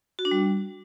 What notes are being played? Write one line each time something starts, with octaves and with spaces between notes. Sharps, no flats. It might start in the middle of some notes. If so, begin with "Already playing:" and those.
F#4
D4
G3